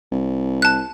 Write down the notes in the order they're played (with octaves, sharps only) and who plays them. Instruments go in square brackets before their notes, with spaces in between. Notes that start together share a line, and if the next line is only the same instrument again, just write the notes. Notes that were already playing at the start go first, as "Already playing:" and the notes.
[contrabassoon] C2
[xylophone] A5 F#6